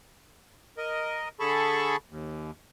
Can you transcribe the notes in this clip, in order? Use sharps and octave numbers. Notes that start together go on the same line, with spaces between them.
A#4 D#5
D3 G#4 A4 A5 B5 C#6
D#2